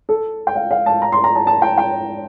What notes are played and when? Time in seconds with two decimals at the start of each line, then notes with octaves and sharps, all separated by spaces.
0.09 A4
0.47 G5
0.55 F5
0.71 F5
0.86 A5
1.02 A#5
1.12 C6
1.24 A#5
1.36 A5
1.47 A5
1.62 G5
1.78 G5